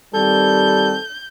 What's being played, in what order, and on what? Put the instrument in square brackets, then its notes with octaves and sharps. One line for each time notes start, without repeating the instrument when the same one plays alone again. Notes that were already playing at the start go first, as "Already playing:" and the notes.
[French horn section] D#3 G3 C4 [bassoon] A4 [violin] G6